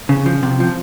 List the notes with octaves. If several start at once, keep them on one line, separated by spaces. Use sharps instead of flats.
C#3
F3
C3
F3